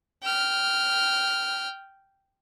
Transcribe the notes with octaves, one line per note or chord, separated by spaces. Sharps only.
G5 F6